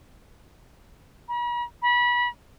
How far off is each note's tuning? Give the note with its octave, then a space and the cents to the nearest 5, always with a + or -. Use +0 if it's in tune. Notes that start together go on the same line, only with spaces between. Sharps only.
B5 -45
B5 -25